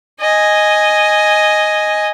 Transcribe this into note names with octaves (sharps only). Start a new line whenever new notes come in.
D#5 G#5